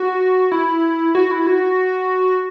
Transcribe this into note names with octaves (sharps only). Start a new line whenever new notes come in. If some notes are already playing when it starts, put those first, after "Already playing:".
Already playing: F#4
E4
F#4
E4
F#4